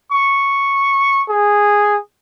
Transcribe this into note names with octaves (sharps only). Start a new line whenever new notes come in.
C#6
G#4